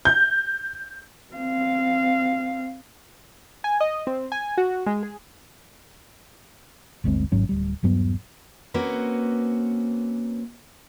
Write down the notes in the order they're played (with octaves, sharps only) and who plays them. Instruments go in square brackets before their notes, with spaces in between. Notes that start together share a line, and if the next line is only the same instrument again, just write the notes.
[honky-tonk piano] G6
[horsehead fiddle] C4 F5
[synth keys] G#5
D#5
C4
G#5
F#4
G#3
G#4
[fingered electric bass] G1 D2 G#3 C4
G#1 G#2 F#3 C#4
D1 G3
D#1 G2 F#3 B3
[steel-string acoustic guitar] A#3 C4 C#4 F#4 B4